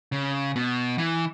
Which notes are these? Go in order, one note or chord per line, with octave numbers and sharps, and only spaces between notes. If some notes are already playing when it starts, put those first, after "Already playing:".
C#3
B2
E3